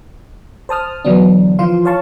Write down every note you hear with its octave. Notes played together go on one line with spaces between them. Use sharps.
C5 A5 D#6 F6
D3 E3 F#3 B3 D4
E3 F3 F4 F5 C6
C#5 F5 A5 C#6